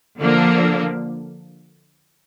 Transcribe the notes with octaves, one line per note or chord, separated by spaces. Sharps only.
D3 F3 A#3 D4